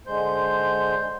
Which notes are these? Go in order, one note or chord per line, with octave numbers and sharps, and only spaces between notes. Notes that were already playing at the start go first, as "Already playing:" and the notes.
D3 G#3 C5 G6